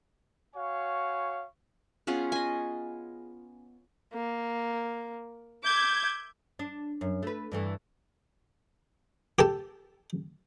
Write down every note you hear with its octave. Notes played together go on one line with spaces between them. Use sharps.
F#4 C#5 F5 G#5 C#6
B3 C#4 F4 G#4
D#5 G#5
A#3
E5 D6 G6 G#6
D4
F#2
A3 B4
G2 E3 A3
G4 A4 A5